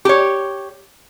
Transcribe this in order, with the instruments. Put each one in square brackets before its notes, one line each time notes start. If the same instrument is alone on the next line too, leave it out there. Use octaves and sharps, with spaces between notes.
[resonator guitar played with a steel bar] G4 C#5